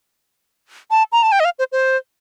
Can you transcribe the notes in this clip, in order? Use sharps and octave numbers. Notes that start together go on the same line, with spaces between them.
A5
A#5
A5
G5
D#5
F5
C5
C5